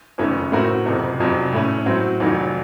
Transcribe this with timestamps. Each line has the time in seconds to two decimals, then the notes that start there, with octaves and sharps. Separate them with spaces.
0.18 F#1 F2 D#3 A3 C#4
0.52 A2 A3 C4 F#4 A#4
0.86 F#1 F2 C3
1.19 F1 F2 C3 F#3
1.52 A2 A3 C#4
1.86 A2 F#3 C4 F#4
2.20 F1 F2 D#3 F#3 A3